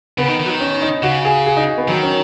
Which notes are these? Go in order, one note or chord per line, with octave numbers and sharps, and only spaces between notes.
C#3 B3
D#3
D#3
F#3
D#3
C#4
D#4
C#3 F#4
G#4
G#4
D#4
B3
D#3 F#3
C#4